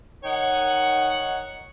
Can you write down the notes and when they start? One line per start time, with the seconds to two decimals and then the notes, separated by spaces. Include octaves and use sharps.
0.24 D#3 D#4 C#5 F#5